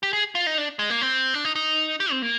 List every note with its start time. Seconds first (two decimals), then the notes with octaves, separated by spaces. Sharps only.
0.03 G4
0.13 G#4
0.35 F4
0.47 D#4
0.58 D4
0.79 G#3
0.90 A#3
1.01 C4
1.34 D4
1.45 D#4
1.55 D#4
2.00 G4
2.11 C4
2.22 A#3